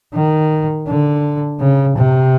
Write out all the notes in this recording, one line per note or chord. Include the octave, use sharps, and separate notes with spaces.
D#3
D3
C#3
C3